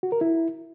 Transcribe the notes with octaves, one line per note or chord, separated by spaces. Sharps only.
F#4
A#4
E4